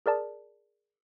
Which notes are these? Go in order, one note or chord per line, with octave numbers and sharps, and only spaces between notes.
G#4 A#4 D5 A5